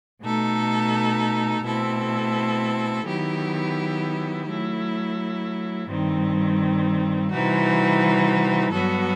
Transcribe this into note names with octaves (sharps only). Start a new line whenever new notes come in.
B2 A3 D#4 A4
B2 A3 C4 E4 A4
D#3 F#3 B3 E4 G4
F#3 A3 E4
G2 D#3 G3 C4
C3 E3 G3 D#4 F#4
G2 F#3 B3 F#4 A4